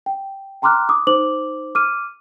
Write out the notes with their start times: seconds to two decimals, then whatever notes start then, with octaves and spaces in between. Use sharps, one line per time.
0.06 G5
0.62 G5 A#5 C6 D6 F6 F#6
0.89 D6 D#6
1.07 D#4 C5 D6 F#7
1.75 D6 F6 D#7